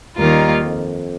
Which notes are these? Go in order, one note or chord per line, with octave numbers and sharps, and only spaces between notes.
D#2 D#3 G3 A#3 F4 A#4
F2